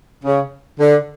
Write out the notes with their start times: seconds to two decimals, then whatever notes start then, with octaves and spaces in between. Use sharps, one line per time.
0.24 C#3
0.80 D3